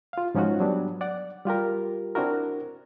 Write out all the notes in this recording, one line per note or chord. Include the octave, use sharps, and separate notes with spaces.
F4 F5
G#2 F3 C#4 D#4 F4 F#4
F#3 G3 B3 D4
D5 F#5
G3 F4 G4 A#4
C4 D4 E4 F#4 A#4